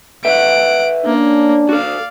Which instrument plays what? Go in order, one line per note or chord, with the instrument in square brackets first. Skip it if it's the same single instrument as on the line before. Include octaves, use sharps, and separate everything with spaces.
[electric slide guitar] A4 B4 E5 [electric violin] F#5 D7
[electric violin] A#3 [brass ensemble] C#4 D4
[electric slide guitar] F#4 A4 [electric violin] D5 F5